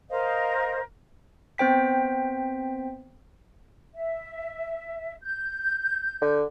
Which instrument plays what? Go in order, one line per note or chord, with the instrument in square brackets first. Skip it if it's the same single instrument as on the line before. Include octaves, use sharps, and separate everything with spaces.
[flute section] A#4 C5 D#5 F5
[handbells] B3 C4 C5 G5 B6
[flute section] E5
G6
[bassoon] D3